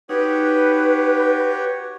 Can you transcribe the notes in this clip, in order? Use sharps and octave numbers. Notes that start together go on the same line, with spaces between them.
D#4 F#4 G4 B4 C#5